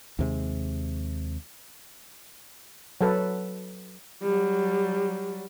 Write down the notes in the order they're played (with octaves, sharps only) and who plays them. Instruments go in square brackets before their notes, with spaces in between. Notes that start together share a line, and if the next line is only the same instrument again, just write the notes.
[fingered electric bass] D#2 C3 G#3
[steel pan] F#3 A4 B4
[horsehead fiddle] F#3 G3